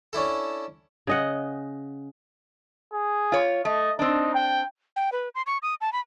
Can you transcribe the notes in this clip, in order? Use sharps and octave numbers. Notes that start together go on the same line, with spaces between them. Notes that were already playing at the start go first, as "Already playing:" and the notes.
C#4 D4 E4 A4
C#3 D#5 F#5
G#4
F4 C#5
A3 D#5
C4 D4 D#4
G5
G5
B4
C6
C#6
D#6
A5
B5